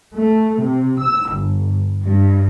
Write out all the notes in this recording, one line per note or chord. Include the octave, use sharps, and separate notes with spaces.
A3
C3
E6
G1
G2